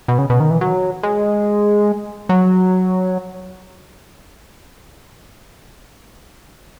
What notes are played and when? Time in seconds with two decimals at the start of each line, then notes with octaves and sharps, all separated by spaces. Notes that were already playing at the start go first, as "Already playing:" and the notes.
0.08 B2
0.18 C#3
0.30 B2
0.40 D#3
0.50 E3
0.61 F#3
1.03 G#3
2.29 F#3